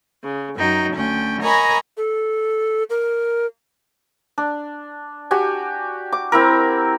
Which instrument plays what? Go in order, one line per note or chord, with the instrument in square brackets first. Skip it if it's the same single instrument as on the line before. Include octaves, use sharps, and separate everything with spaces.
[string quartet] C#3
F#2 F#3 D#4 G5
D2 C#4 G5
A#4 C#5 D#5 G#5 A#5 B5
[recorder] A4
A#4
[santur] D4
F#4 G4 G#5
D6
C4 E4 A#4